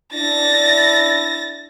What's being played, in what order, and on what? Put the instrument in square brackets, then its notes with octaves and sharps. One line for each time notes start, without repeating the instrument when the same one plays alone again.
[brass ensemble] D4 E4 [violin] A6 A#6